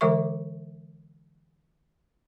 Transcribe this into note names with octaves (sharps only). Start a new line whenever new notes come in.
D3 E3 G#3 A#4 E5 C#6